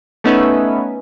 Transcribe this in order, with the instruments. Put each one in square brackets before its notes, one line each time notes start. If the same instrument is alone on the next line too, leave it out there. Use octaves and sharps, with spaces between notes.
[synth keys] A3 B3 C#4 D#4 B4 E5